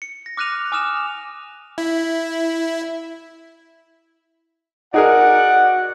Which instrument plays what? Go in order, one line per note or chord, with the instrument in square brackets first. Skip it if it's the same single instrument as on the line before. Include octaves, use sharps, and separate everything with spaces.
[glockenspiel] C#7
A#6
D6 F6 F#6 A#6 D#7 F7
G#5 D6 D#6 F6 E7 F7
[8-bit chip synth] E4
[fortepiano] D#4 G#4 A#4 [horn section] F#4 D5 F#5